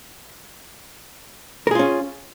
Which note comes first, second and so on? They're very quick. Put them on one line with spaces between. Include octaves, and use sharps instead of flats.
A#4 G#4 F4 C#4